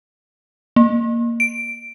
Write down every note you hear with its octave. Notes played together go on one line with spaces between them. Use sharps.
A#3
D7